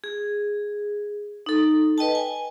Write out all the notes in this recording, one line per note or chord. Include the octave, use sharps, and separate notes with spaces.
G#4
D#4 A4
B4 D#5 G5 A5
G#5